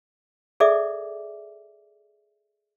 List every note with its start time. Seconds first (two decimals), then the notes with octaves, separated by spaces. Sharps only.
0.60 G#4 A4 D5 E5 D6